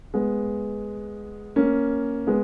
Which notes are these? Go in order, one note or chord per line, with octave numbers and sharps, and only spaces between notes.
G#3 B3
A#3 C#4
G#3 B3